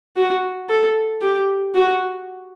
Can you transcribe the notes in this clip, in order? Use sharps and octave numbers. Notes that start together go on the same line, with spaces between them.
F#4
A4
G4
F#4